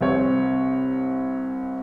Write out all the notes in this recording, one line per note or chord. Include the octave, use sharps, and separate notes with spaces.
C2 C4 C#5